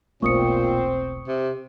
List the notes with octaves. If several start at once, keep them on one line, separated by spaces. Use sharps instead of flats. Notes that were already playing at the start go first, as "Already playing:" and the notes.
E1 B1 A#2 A3 C4 C#6 D#6 C#7
C3